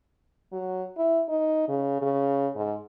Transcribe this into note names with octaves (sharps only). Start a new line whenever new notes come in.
F#3
E4
D#4
C#3
C#3
G#2